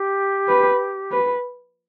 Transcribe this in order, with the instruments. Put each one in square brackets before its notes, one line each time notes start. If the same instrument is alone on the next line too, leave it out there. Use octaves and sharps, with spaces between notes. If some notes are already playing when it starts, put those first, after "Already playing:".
Already playing: [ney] G4
[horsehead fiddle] B4
B4